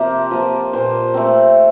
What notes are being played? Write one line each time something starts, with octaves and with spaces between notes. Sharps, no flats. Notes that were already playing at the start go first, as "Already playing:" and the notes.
Already playing: C3 F3 A#3 A#4 C5
F3 A#3
A#2 C5
A3 C4